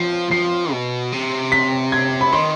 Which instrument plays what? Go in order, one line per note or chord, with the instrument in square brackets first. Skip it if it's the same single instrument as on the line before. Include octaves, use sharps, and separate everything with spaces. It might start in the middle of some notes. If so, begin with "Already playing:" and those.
Already playing: [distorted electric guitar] F3 [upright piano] C7
[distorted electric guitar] F3 [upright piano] C7
[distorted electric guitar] B2
C3
[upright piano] B6
G#6
B5
[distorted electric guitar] D#3 [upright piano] C6